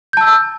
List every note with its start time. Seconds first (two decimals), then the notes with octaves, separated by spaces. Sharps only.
0.13 G6
0.17 A5
0.21 E6